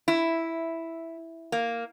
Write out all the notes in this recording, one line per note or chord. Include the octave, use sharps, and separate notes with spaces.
E4
A#3